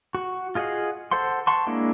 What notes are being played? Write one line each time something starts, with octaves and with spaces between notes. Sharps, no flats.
F#4
F4 G#4 D#5 F5 F#5
A4 C5 F#5 C6
F#5 A5 C6 C#6
G#3 A#3 D4 E4